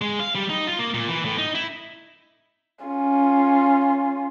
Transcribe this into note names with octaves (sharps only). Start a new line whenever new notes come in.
G#3
F5
G3
D#4
F4
A#3
A#2
E3
A2
D#4
E4
C#4 F4